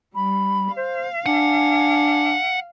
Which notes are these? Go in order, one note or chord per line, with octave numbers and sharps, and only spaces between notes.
G3 B5
C5 F5
D4 F#5 G#5